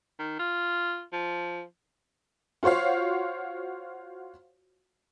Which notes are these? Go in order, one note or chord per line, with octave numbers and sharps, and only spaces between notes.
D#3
F4
F3
F4 F#4 C5 C#5 F5